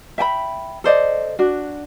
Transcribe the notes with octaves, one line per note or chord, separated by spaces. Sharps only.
E5 G5 G#5 B5
A4 C5 D5 D#5
D4 F#4